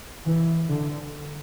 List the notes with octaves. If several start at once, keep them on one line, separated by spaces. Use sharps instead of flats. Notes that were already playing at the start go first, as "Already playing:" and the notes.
E3
D3